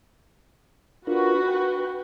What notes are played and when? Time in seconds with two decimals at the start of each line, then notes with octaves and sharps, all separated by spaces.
1.07 D4 F4 F#4 A#4 B4
1.48 G5